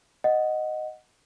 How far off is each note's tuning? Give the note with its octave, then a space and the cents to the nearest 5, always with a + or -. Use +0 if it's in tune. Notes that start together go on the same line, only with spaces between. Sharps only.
D#5 +0 F#5 +0